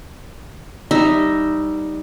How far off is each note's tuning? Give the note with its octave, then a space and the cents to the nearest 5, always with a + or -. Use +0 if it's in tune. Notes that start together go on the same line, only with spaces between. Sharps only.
G3 +0 D#4 +0 E5 -10